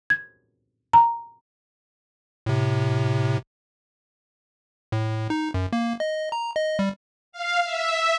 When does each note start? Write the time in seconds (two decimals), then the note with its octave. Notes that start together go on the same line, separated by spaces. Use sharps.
0.10 G#6
0.93 A#5
2.46 A2 C3
4.92 A2
5.30 D#4
5.54 F#2
5.73 A#3
6.00 D#5
6.32 A#5
6.56 D#5
6.79 G3
7.32 F5
7.64 E5